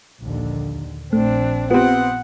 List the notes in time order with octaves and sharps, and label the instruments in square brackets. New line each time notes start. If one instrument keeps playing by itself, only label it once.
[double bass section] A#1 D#2 D3
[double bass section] A#1 [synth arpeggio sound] A3 [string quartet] C4 D4
[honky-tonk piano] B3 C4 [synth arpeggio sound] F4 G4 [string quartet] F#5